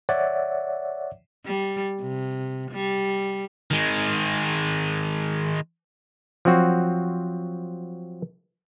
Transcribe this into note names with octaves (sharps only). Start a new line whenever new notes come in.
C#5 D5 E5 F#5
G3
C3
G3
D#3 G#3
F3 F#3 C4 F#4